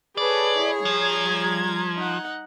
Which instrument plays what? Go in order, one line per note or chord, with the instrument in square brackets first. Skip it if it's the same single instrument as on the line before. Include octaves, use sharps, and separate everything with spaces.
[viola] G#4 C#5 [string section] A4 B4 [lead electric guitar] D5
[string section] E4
[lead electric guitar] F3 [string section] G3 A#5 G#6
[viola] D#4 F#5